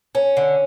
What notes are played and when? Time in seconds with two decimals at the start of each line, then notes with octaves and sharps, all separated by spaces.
0.15 C#4
0.37 D3